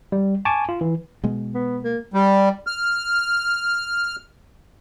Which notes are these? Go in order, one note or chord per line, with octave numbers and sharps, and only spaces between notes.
G3
G#5 A5 C#6 D6
F4
E3
B2 G#3
B3
A#3
G3
F6